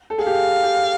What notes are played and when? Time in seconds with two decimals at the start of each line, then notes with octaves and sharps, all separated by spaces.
0.10 A4
0.18 G#4
0.25 G4 F5
0.63 G4